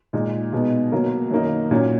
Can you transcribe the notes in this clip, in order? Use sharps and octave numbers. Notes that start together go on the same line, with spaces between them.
A#2 G#3 D#4
B2 G#3 B3 D#4
B2 F#3 A#3
F#2 D#3 A#3 D#4
A#2 F#3 C#4